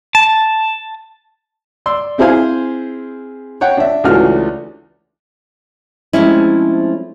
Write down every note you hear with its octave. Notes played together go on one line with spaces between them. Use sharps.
A5
D5 C6 E6
C4 E4 G#4 C5 F5 G#5
C#5 F#5 G5
D4 E5
C#2 E3 A3 D4 F#4 F6
F3 G#3 A3 C4 C#4 E4